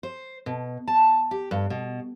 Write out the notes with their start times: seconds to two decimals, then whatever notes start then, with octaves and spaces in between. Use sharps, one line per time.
0.03 C5
0.46 B2
0.88 A5
1.31 G4
1.51 G2
1.70 B2